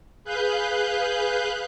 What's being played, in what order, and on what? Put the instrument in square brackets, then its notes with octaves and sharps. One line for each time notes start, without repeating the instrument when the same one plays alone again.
[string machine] G#4 B4 F5 F#6 G6